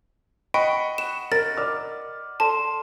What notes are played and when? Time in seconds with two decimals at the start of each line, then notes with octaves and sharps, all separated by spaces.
0.54 D#5 F#5 G5 B5 C#6
0.98 F#5 E7
1.32 A#4 A6
1.57 D5 F6
2.40 A4 D5 A5 C6